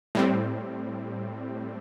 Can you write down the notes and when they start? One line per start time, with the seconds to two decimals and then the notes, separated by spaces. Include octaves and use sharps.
0.15 A2 G3 C4